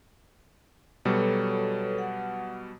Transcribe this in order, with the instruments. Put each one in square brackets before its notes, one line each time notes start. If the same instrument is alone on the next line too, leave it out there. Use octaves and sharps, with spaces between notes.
[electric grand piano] B2 F#3 G3 [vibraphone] A4 B4 C#5
[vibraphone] F#5